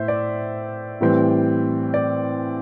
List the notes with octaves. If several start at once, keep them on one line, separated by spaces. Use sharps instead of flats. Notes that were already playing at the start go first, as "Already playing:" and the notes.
Already playing: A2 C5 E5
D5
A2 E3 G3 C4
D5